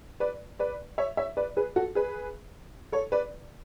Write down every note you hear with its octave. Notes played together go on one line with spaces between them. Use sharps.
B4 D5
B4 D5
C#5 E5
C#5 E5
B4 D5
G#4 B4
F#4 A4
G#4 B4
A4 C#5
B4 D5